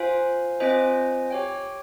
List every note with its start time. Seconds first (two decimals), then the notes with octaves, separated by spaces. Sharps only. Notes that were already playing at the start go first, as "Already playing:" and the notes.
Already playing: F4 C5 F5 G#5
0.60 C4 F4 C5 D#5 G#5
1.31 G4 C#5 G5